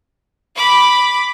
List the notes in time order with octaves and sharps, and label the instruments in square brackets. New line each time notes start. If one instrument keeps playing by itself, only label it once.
[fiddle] B5 D6